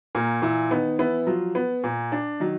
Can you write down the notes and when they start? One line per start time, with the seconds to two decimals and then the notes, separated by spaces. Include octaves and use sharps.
0.15 A#2 A#3 A#4
0.42 A#2 E3 E4
0.71 D#3 B3 D#4
0.99 E3 B3 E4
1.27 F3 F#3 F4
1.55 B3
1.84 A#2
2.12 D4
2.40 D#3 F#3 D#4